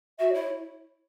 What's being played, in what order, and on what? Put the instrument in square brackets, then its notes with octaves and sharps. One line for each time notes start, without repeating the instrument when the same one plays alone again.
[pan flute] F#4 [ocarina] E5
[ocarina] C#5
[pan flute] E4
[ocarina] C#5